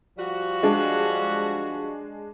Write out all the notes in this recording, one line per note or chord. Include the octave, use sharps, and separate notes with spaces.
F3 G3 F#4
G#3 D4